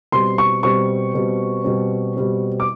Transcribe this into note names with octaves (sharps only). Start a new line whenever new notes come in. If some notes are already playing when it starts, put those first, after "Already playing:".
B2 G3 C4 C6
C#6
B2 G3 C4 C#6
B2 G3 C4
B2 G3 C4
B2 G3 C4
D6